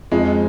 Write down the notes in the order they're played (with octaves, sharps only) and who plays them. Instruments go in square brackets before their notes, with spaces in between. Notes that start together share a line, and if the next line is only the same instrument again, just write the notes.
[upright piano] F2 [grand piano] G#3